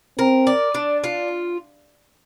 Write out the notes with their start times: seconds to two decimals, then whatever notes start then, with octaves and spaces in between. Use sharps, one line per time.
0.19 C4 A#4
0.47 D5
0.74 D4
1.04 F4